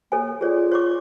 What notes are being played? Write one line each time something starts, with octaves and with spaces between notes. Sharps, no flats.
A#3 A4 C#5 G#5
F4 G#4 C#5 D5
C#5 C#6 D6